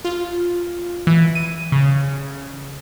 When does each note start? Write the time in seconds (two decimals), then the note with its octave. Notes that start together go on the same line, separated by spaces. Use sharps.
0.05 F4
1.07 E3
1.35 D#7
1.72 C#3